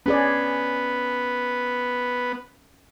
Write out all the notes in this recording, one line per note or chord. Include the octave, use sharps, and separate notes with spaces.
B3 C#4 G#4 D5